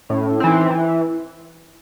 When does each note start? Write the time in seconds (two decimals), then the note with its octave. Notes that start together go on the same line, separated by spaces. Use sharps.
0.09 A2 C#4
0.30 E4
0.40 E3 C4 D#4
0.70 E3 E4